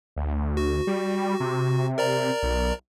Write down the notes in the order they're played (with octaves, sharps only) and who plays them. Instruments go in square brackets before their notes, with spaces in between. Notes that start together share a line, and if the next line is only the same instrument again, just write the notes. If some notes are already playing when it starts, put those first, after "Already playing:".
[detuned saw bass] D2
[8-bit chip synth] F#4
[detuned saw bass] G3
C3
[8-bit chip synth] A#4 D5 A#5
[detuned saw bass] B1